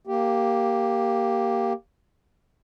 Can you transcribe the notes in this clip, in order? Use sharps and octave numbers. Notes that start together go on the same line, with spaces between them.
A#3 G4